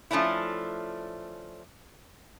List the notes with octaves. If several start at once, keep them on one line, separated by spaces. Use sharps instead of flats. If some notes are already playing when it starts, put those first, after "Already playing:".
F3 A3 C#4 D4 E4